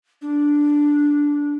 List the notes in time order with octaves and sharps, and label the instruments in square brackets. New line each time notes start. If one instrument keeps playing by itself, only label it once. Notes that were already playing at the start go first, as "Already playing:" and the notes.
[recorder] D4